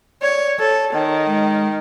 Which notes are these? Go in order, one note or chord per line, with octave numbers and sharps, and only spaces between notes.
C#5 D5
A4 C#5
D#3
G#3